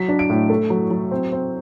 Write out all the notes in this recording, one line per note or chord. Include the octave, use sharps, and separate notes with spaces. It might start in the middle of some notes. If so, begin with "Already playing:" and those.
Already playing: F#3 B6
D4
D7
A2
A3
F#3
F#3
C4
C4